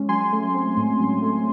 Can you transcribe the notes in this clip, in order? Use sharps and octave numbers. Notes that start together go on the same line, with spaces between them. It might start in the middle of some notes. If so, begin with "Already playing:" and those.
Already playing: G#3 C#4
F#3 G#5 C6
A3
C4
A2
F#3
A3